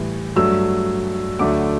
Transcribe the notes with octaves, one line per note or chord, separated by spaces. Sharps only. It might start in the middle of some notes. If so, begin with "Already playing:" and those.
Already playing: A2 E3 G3
G2 F#3 A3 E6
D2 D3 F#3 A3 D6